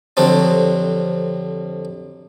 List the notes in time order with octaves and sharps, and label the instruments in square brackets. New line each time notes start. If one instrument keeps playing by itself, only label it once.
[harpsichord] F2 D3 F#3 G3 C4 D4